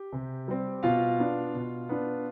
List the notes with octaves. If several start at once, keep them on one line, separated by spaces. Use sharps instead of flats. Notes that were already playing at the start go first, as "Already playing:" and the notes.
Already playing: G4
C3
G3 C4
B2 F4 F5
B3 D4
B2
B3 D4